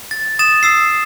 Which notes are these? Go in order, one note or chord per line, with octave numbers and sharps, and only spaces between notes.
A6
D#6 A6 E7
D#6 E6 C7